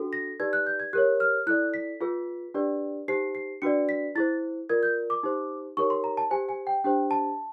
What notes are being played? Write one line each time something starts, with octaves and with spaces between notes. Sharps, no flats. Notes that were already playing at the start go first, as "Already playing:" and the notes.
Already playing: D4 F#4 A4
A#6
D#4 G4 B4 D5 G#6
F#6
G6
G#6
G4 A#4 C#5 F#6
F6
E4 A4 D5 F#6
B6
F4 G#4 B4
D4 G4 B4 D5
D#4 G4 C5 C7
C7
D4 F#4 B4 D5 C#7
B6
E4 G#4 C5 A6
F4 A#4 D5 G#6
G6
D6
D#4 G4 C5
D#4 G4 A#4 C#5 C#6
C6
A#5
A5
G4 C5 G#5
G#5
G5
D4 G4 C5 G5
A5